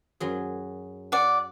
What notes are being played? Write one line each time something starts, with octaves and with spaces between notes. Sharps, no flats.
F#2 F#3 G#4
D5 F#5